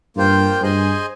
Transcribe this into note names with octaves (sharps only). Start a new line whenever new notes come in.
G2 A#3 F4 C5 G5
G2 G#4 C5 D#5 G#5